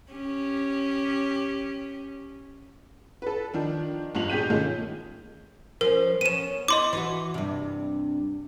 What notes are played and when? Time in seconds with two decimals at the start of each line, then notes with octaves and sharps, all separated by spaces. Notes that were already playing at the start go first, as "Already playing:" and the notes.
0.12 C#4 G4
3.22 A4 B4
3.54 D#3 F3 D4
4.15 F#1 G2 G#3 F4 F7 F#7
4.30 B2 G4 G#4 G6 B6 D#7
4.50 D#3 G#3 A3 C#4 F4 G#4
5.81 F3 C#4 A#4
6.21 B3 C#4 D#7 E7
6.68 E4 D#5 C6 D6
6.93 E3 E4 F#4
7.34 G2 C3